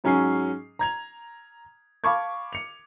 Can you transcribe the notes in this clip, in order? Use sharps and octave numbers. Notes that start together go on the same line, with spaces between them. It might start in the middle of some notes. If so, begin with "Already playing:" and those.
G#2 F#3 C#4 G#4 G#5 C7
A#5 G#6 F7
F5 A5 B5 C#6 D6 G#6
C#7 F7